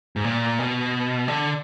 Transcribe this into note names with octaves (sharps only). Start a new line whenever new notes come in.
G#2
A#2
B2
D3